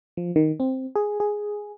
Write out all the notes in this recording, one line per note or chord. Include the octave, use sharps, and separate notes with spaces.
F3
D#3
C4
G#4
G#4